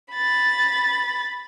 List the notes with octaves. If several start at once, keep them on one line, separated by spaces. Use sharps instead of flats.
B5 A6